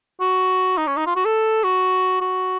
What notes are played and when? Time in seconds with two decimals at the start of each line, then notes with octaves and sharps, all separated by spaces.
0.21 F#4
0.78 D#4
0.87 C#4
0.97 D#4
1.07 F4
1.16 F#4
1.25 A4
1.64 F#4
2.21 F#4